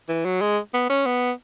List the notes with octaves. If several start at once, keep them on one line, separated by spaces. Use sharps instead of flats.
E3
F#3
G#3
B3
C#4
B3